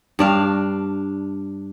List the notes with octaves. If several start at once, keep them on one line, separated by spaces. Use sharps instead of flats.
G2 D4 F5